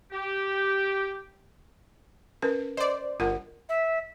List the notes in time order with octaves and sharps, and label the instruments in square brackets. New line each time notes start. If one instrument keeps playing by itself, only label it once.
[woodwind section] G4
[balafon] C#4 A#4 B4
[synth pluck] C5 D5 [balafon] D#5
[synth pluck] G1 [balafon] F4 A#4 F#5
[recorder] E5